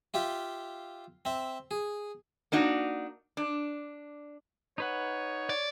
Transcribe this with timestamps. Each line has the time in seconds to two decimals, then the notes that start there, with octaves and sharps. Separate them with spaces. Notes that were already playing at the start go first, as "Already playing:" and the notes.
0.14 F4 G4 E5 F5
1.25 C4 E5
1.71 G#4
2.52 A#3 D4 D#4 F#4
3.37 D4
4.78 D#4 B4 C#5 F#5
5.49 D5